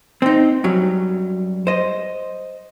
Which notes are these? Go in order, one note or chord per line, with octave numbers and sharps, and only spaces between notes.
C4 D#4
F#2 F#3 G3
C5 D#5